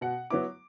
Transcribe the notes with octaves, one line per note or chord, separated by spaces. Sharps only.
B2 F#5
F#3 B3 E4 D6